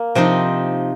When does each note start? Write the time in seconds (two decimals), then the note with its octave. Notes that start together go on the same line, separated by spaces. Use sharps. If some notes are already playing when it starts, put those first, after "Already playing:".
Already playing: A#3
0.15 C3 F3 C4 D#4